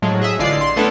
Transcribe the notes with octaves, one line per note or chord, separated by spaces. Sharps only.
A2 F3 F#3 G#3
G#4 D#5 E5
A1 D3 G#3 F4 D5 C7
C6
A3 B3 C#4 D4 E4 A4